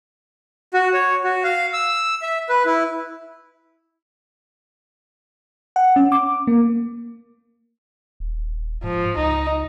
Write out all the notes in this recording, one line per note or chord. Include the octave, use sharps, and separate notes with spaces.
F#4
C#5
F#4
F5
E6
E5
B4
E4
F#5
C#4
D6
A#3
D#1
G#2 F3
C#2 D#4